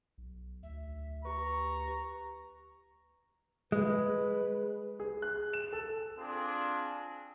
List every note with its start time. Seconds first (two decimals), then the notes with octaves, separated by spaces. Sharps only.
0.18 B1
0.63 D2 E5
1.25 G4 B4 A#5 C#6
3.72 G#3 B4
5.00 G#4
5.22 F#6
5.53 E7
5.73 A4
6.18 C4 D4 F4 G#4